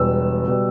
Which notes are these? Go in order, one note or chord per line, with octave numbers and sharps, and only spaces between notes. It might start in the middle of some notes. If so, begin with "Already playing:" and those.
Already playing: E1 E2 B2 G3 B3 E6
B2 G3 B3